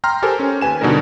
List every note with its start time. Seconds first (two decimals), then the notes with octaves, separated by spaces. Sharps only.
0.04 G5 A#5 C6 F6
0.22 G4 A4 A#4 C5 G#5
0.39 C#4
0.61 D#2 B4 G#5 E7
0.81 B2 D3 G3 D#4 A#4